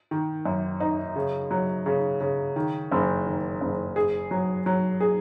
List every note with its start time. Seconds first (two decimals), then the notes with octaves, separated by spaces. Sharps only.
0.11 D#3
0.46 F#2
0.80 D#4
1.16 C#3
1.51 F#3
1.86 C#3
2.21 C#3
2.56 D#3
2.91 F#1
3.26 D#3
3.61 F#1
3.96 G#4
4.31 F#3
4.66 F#3
5.00 G#4